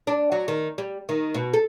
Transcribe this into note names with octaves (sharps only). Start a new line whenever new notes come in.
D4
F#3
D#3
G3
D#3
B2
A4